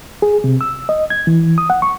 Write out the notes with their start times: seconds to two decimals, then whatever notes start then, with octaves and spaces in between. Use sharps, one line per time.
0.22 G#4
0.44 C3
0.61 E6
0.89 D#5
1.10 G#6
1.27 E3
1.58 D#6
1.70 F#5
1.82 C#6